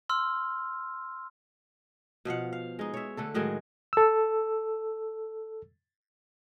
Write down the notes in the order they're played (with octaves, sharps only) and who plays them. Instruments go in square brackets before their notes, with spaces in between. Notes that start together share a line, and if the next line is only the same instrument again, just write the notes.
[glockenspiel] C6 E6 F6
[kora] B2 F3 F5 F#5
F5
G#3 D#4
C#5 E5
D3 A3 A4
A2 D#3 F#3 G#3
[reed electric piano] A4 E6